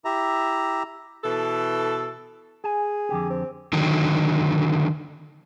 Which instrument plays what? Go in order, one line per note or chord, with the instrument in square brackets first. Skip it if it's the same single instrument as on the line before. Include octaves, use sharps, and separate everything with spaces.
[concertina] E4 G4 E5 A#5
[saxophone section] B2 E3 A4
[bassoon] G#4 [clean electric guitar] G#5
[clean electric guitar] F2 D3 G4
[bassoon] C4
[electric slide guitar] D3 D#3 F#3